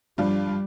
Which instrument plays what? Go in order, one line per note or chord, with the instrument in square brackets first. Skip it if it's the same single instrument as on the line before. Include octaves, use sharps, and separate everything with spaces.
[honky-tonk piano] G2 F3 D4 F4 [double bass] G3